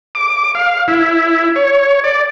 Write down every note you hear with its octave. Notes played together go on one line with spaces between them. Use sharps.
D6
F5
E4
C#5
D5